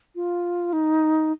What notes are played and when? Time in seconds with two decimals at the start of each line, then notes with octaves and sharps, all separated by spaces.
0.15 F4
0.73 D#4